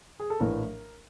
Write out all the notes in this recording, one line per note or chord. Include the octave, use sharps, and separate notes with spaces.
G#4
A4
A#1 A2 E3 A3 A#4